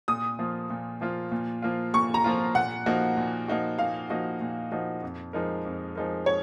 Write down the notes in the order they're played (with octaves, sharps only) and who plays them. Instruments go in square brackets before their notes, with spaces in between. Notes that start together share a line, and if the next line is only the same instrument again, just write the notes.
[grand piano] A#2 [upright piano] D#6
[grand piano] F3 A#3 F4
A#2
F3 A#3 F4
A#2
F3 A#3 F4
[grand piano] A#2 [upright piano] C#6
[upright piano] A#5
[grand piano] F3 A#3 F4
[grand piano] A#2 [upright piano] F#5
[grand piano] F3 A#3 D#4 F#4
A#2
F3 A#3 D#4 F#4
[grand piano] A#2 [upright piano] F5
[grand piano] F3 A#3 D#4 F#4
A#2
F3 A#3 D#4 F#4
F2
F3 G#3 D#4 A#4
F2
F3 G#3 D#4 A#4
[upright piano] C#5